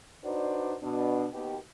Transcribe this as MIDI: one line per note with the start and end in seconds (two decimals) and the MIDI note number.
0.24 0.75 62
0.24 0.75 63
0.24 0.75 66
0.24 0.75 71
0.24 0.75 72
0.24 0.75 74
0.82 1.27 47
0.82 1.27 62
1.33 1.57 39
1.33 1.57 47
1.33 1.57 67